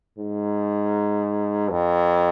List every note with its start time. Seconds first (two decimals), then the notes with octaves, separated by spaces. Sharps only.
0.18 G#2
1.71 F2